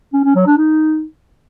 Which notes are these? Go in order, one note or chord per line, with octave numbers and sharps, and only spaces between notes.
C#4
C#4
F#3
D4
D#4